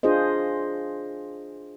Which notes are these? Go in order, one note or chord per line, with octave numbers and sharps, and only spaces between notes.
D4 F4 G#4 C5 D#5